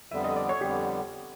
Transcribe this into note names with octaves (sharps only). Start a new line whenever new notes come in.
F2 D3 G3 B3 E5
D#5
D5
C#5
F2 D3 G3 B3 G4